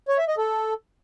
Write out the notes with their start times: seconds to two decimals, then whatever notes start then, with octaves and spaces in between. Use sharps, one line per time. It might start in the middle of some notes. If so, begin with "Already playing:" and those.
0.08 C#5
0.18 E5
0.28 D#5
0.38 A4